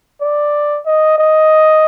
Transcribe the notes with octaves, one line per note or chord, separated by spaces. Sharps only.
D5
D#5
D#5